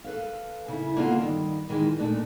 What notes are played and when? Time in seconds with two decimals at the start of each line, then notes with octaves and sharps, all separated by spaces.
0.04 A4 B4 F5
0.68 C#3 E4
0.96 D3 A#3 B3 C#4 F4 A4
1.21 G2 D#3
1.69 D#3 E3 G#3
1.98 A#2 A3 D4 D#4